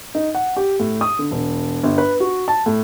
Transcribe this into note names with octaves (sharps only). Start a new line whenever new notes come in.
D#4
F#5
G4
A2
D#6
D3
E1
G1
B4
F#4
A5
A2